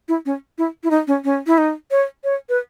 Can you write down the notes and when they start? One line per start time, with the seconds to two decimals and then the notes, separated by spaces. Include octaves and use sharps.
0.08 E4
0.26 C#4
0.58 E4
0.84 E4
0.91 D#4
1.07 C#4
1.24 C#4
1.47 E4
1.58 D#4
1.91 C#5
2.24 C#5
2.49 B4